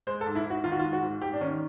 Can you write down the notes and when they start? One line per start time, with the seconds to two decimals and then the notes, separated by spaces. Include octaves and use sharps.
0.07 G#3 C5
0.21 A4
0.26 G#2
0.35 E4
0.45 G#2
0.50 F#4
0.64 D#3 F4
0.72 F#4
0.79 F4
0.84 G#3
0.93 F#4
1.02 G#2
1.22 G#2 G4
1.33 D4
1.41 D#3 C#4